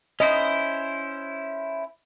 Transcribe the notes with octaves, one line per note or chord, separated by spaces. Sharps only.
C#4 E4 C5 D#5